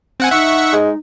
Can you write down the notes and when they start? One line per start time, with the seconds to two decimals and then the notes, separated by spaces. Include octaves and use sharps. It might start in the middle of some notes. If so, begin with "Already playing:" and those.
0.20 C4 F#5 G#5
0.31 D#4 E5 F#5 C#6
0.72 G#3